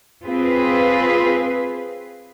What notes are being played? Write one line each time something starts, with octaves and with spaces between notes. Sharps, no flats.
C4 F4 G#4 B4